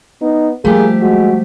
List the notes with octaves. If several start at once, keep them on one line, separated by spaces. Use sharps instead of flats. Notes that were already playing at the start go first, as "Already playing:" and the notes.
B3 D#4
F3 G3 A3 A#3 G4 G#4
G#3 F#4